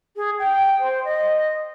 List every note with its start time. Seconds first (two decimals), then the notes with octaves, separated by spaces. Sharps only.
0.16 G#4
0.39 G5
0.80 C5
1.04 D#5